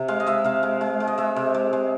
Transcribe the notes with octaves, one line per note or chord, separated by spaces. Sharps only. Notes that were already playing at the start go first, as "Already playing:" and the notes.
Already playing: C3
G#3 F5
D#5
G#3 E5
C3 F5
G#3
G#3
G#3
D#5
G#3 E5
C3
G#3
G#3